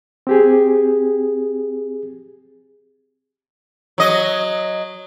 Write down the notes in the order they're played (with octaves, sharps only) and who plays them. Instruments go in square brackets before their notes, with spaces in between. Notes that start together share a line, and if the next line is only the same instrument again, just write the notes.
[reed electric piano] C4 G4 G#4
[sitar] F#3 D#5